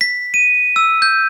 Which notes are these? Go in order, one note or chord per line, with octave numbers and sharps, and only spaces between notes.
B6
D#7
E6
G6